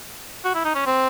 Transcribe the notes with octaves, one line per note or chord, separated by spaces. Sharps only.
F#4
E4
D#4
C#4
C4